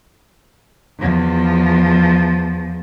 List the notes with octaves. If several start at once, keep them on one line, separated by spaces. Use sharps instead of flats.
E2 F3